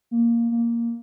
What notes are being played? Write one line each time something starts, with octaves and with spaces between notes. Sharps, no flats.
A#3
A#3